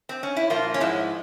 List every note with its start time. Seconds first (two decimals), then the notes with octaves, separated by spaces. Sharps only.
0.09 C4
0.23 C#4
0.37 E4
0.50 A#2 F3 A#3 F4
0.74 C#4
0.80 G#2 F3 G#3 E4